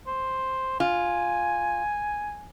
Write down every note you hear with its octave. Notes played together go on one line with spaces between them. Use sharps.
C5
F4 G#5